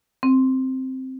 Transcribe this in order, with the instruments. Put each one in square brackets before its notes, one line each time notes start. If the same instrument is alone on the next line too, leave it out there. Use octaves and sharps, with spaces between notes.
[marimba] C4